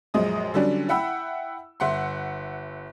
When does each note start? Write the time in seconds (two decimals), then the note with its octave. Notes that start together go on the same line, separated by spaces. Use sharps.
0.14 A#1 F#2 G#3 D#6
0.54 D3 F#3 G3 C#4 D4
0.89 E4 E5 F#5 G5 B5 E6
1.80 G1 E5 F#5 C6